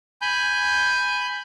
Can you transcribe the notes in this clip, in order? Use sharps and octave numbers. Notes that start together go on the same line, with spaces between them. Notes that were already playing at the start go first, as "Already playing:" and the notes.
G#5 B5 G6